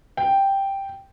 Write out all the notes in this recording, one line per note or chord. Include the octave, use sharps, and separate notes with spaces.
G5